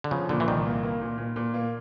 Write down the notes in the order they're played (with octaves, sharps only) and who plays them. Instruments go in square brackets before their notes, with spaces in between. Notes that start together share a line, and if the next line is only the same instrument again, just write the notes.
[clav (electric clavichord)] D3
[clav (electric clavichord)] C#3 [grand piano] F3
[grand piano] A#2 [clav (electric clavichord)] D3
[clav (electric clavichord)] E3
[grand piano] C2 [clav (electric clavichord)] D#3
[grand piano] A#3
A#3
A#2
A#2
A#2
A#3